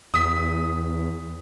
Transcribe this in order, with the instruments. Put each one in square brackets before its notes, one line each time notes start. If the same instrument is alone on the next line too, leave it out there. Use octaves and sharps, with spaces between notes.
[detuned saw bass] E2 [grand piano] D#6 B6